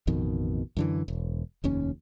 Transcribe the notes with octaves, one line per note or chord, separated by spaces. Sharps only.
A1 F2 B2 D#3
F#2 D3 E3
E1
F1 D#2 C#4